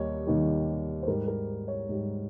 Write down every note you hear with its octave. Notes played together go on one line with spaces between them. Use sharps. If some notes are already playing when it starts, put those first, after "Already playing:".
Already playing: D#2 D#3 G3 C#5
D#2 D#3 G3
C5
G#2 G3 A#4
A#4
C#5
G#2 G3